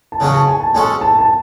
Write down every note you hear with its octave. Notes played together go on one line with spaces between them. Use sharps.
A5
C#3 F#3 C#4 F#4 G#5
A5
G#5
A5
G#3 C#4 F#4 A4 G#5
A5
A5